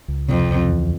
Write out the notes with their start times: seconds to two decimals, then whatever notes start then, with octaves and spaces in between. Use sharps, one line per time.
0.08 C#2
0.28 F2 C3
0.49 C#2
0.69 E2